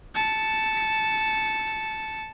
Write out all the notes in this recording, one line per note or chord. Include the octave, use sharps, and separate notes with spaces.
A5 C#7